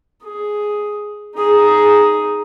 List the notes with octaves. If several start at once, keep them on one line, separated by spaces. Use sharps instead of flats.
G#4
D#4 G#4